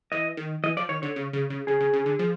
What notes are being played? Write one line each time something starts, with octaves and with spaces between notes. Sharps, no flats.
E3 D#5
D#3
E3 D#5
F3 D5
D#3 C#5
D3 C#5
C#3
C#3
C#3
C#3 G#4
C#3
C#3
D3
F3